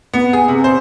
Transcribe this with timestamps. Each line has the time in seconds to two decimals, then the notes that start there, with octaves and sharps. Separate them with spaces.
0.14 B3
0.33 G#4
0.48 C3
0.64 C5